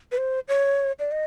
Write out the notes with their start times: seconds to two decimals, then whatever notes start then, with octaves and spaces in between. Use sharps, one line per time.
0.12 B4
0.18 C5
0.48 C#5
0.99 D5
1.11 D#5